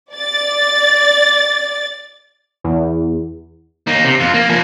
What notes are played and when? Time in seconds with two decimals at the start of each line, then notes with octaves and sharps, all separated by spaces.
0.13 D5 A6
2.64 E2
3.87 A#3 D#4
4.05 C3
4.20 F2 F4
4.34 A#3
4.49 F3 G#5